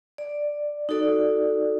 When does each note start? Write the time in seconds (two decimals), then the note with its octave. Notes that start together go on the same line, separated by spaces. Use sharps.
0.18 D5
0.89 D#4 F#4 A4 D5